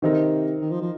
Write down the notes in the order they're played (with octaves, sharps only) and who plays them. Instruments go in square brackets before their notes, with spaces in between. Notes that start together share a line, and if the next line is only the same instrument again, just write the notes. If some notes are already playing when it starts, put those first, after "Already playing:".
[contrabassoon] C3 [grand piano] D#3 C4 D#4 A#4
[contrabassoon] D#3
F3
F3